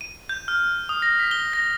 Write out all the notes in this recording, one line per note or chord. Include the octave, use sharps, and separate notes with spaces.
D#7
G6
F6
D#6
A#6
B6
G7
A#6